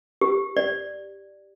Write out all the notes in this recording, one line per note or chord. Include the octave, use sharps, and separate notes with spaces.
G4
D5